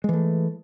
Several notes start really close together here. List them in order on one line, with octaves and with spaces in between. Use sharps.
G#3 E3 A3